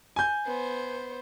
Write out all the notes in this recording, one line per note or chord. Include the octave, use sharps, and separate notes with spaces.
G#5 G6
B3 C5